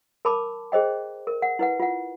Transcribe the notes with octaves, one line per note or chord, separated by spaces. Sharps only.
A#4 A5 B5 D6
G#4 C5 D#5 G5
A#4
F#5
E4 B4 F#5
F4 F#5